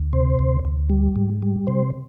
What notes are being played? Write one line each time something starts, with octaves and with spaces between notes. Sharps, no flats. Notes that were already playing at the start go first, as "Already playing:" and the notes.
Already playing: D2
C3 C5
D2
D2
G3
G#2
G3
C3 C5